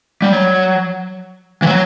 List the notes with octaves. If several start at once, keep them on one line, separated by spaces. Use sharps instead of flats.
G3
F#3
E3
F#3